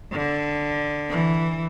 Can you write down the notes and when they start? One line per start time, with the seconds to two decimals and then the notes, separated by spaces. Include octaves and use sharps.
0.12 D3
1.10 E3